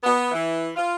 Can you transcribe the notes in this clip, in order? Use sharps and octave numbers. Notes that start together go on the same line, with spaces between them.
B3
E3
F4